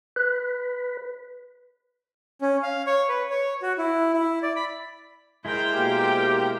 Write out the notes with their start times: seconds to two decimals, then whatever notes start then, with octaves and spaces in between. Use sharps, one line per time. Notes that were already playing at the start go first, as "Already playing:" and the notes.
0.16 B4
2.41 C#4
2.63 F5
2.87 C#5
3.09 B4
3.30 C#5
3.62 F#4
3.78 E4
4.14 E4
4.43 D5
4.56 B5
5.45 G#3 E4 A#4 C5 G5
5.74 B2 A#3 G4